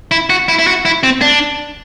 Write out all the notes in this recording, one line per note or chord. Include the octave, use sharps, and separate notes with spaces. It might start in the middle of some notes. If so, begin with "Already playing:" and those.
E4
F#4
E4
E4
F#4
E4
C4
D4